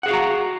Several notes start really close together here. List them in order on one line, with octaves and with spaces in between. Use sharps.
F#5 G#4 F5 F#4 A#5